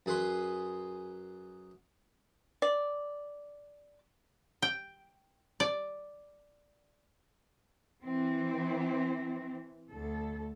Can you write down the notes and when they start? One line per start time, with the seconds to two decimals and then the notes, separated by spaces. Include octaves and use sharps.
0.06 F#2 G#4 B4 C6
2.62 D5
4.62 G5
5.60 D5
8.02 E3 C4
9.92 D2 A4